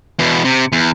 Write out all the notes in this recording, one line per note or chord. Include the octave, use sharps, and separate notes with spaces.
E2 B2
C3
E2